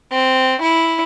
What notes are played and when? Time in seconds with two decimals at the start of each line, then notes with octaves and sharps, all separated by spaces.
0.11 C4
0.61 E4